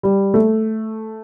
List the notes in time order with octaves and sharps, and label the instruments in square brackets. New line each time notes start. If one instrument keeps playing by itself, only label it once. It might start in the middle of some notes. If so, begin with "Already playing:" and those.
[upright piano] G3
A3